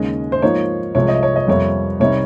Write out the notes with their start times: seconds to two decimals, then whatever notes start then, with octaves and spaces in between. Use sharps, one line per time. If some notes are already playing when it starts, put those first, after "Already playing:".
Already playing: D#2 C#3 G#3 C#4 D#5
0.32 C5
0.42 G#2 F3 A#3 D#4 C#5
0.95 C2 C3 F3 G#3 C#5
1.08 D#5
1.23 C#5
1.36 D#5
1.47 F2 C3 G3 A#3 C#5
2.00 C2 C3 G3 C4 D#4 C#5